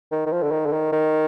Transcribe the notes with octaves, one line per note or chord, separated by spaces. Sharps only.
D#3
D#3
F3
D3
D#3
D3
D#3
D#3